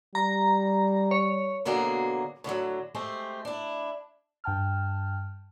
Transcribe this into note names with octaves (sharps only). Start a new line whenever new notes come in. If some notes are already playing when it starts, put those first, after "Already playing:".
G3 A#5
C#5
B2 D3 F#3 A#3 G#4
A2 D3 F3 F#3
G#3 A3 C4 G4
D4 E4
G2 G5 A5 F6